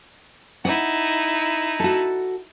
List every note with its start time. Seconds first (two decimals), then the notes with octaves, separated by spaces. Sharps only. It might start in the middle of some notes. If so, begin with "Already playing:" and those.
0.65 D#4 E4 F#5
1.80 F#4 A4